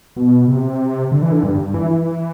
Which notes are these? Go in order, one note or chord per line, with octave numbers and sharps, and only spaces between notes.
B2
C3
D3
E3
D3
G2
G2
E3
E3